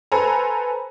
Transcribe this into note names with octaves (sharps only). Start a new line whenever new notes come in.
A4 B4 C5 G#5 A#5